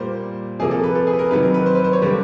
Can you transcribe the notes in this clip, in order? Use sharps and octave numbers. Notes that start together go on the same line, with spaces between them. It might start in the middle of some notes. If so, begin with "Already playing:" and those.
Already playing: A#2 G3 A#3 C5
C3 F3 A#3 G#4
A4
B4
A4
G#4
B4
A#4
C3 D#3 F#3 B4
A#4
B4
C5
B4
C5
C#5
D3 G3 A#3